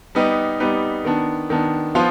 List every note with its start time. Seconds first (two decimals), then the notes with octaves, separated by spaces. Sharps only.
0.15 G3 B3 D#4 G4 B4
0.60 G3 B3 D#4 G4 B4
1.05 D#3 B3 D4
1.50 D#3 B3 D4
1.95 F3 B3 F4 C5 F5